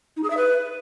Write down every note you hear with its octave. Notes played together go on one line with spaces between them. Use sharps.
D#4
G#4
E5
B4